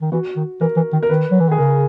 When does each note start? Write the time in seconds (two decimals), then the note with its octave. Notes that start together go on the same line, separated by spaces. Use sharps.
0.01 D#3
0.12 E3 F#4
0.36 D#3
0.61 E3 A#4
0.76 E3
0.93 D#3
1.03 A#4
1.09 D#3 B4
1.31 F#3
1.40 E3
1.49 D#3 G#4
1.58 C#3 A#4